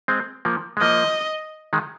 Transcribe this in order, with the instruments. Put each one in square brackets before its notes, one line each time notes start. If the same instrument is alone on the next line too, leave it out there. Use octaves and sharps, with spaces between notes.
[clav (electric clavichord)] G#3 C4
F3 A#3
G#3
[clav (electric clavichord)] F3 A#3 [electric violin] D#5
[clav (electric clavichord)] D#3 G#3